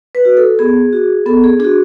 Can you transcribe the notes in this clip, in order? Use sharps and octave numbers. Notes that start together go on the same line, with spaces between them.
B4
F#4
A4
B3 G#4
F#4
B3 A4
G#4
D4 F#4 G#4